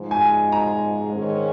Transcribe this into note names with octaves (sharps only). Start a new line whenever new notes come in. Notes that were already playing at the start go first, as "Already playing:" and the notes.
Already playing: G#2 F3 G#3
G#5
A#5
G#2 D#3 G#3 C#4 G#4